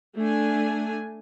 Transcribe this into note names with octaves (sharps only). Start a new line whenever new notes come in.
A3 D4 G#5